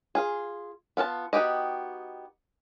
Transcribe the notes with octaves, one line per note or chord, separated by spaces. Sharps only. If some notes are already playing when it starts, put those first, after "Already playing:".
F4 G#4
B3 F4 F#5 A5
B3 D#4 F#4 G4 D#5